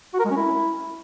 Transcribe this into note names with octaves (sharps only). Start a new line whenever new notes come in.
F#4
A#4
G#3
C#4
E4